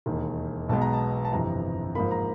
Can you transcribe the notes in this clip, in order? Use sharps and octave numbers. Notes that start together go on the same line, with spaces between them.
E1 D#2 D#3
B1 B2 G#3 B3 A5
A#5
A5
A5
G1 F2 C3 E3 A#5
G#2 F3 A#3 B5
A#5